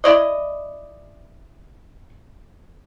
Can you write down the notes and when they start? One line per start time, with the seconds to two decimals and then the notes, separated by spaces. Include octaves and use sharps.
0.04 E4 D5 D#5